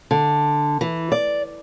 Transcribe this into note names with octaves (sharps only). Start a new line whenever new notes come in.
D3
E3
D5